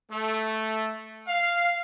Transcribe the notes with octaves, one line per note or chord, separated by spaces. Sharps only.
A3
F5